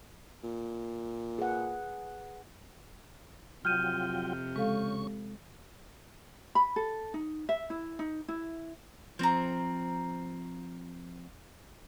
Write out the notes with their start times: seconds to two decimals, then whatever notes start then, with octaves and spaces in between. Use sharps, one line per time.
0.44 A#2
1.38 G#4 B4 F#5
3.65 F2 C3 F#3 F4 G5 F6 G6 D#7
4.56 C#3 G#3 A4 F5 C#6
6.55 B5
6.76 A4
7.14 D#4
7.49 E5
7.70 E4
7.99 D#4
8.28 E4
9.19 F3 C4 C5 A#5